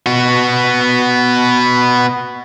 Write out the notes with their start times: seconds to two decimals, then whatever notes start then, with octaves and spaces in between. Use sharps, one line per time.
0.06 B3 F#4